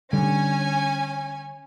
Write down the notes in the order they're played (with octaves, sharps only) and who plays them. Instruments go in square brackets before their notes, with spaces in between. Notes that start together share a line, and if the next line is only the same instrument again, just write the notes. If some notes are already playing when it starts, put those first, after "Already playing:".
[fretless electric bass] D3 G3 [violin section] C#4 G#5